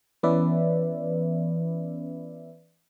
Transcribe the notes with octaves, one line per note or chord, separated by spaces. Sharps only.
E3 B3 C#4 B4 D5 E5